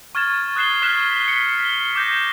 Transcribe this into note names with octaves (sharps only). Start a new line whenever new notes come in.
C#6 F6 G#6 A6 E7
D#6 F#6 A6 C7 E7 G7
C#6 F6 F#6 G#6 B6 E7
B6 C#7
F6 G7
D6 G6 A#6